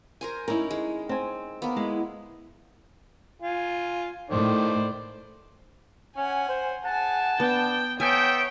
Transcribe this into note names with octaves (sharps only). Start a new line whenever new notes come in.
A#4 C5 G#5
C#4 D#4 E4 A#4
G#3
C4 G#5
A#3 B3
G#3 E4
F4 G#5
A2 D#3 C5 D5
C#4 F#5 G#5
C5
G#4 F#5 G#5 A5
B3 D4 G5
B3 A4 C#5 E5 G5 G#5